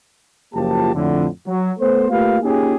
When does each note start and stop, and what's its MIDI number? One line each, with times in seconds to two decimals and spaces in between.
0.54 0.93 30
0.54 0.93 53
0.54 0.93 58
0.54 0.93 65
0.54 0.93 67
0.54 0.93 81
0.94 1.26 41
0.94 1.26 45
0.94 1.26 50
1.47 1.71 54
1.79 2.08 57
1.79 2.08 59
1.79 2.08 69
1.79 2.08 72
2.10 2.37 57
2.10 2.37 58
2.10 2.37 65
2.10 2.37 67
2.10 2.37 71
2.10 2.37 77
2.42 2.76 58
2.42 2.76 61
2.42 2.76 63
2.42 2.76 65
2.42 2.76 67
2.42 2.76 68